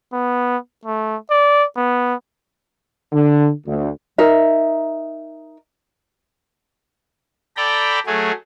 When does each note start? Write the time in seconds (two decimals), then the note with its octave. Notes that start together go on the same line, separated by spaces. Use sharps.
0.13 B3
0.85 A3
1.31 D5
1.76 B3
3.12 D3
3.65 D2
4.18 D#4 A#4 E5
7.57 A4 D5 G5 A#5 B5
8.06 F#3 A3 G#4